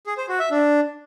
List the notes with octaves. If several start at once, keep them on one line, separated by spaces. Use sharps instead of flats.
G#4
C5
F#4
E5
D4